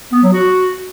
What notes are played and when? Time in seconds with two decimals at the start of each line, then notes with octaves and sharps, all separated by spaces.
0.12 B3
0.22 F#3
0.32 F#4